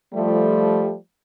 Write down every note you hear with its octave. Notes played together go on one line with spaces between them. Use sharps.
F3 G3 A3